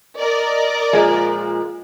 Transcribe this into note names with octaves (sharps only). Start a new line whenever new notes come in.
A#4 D5 D#5
A#2 F3 G#3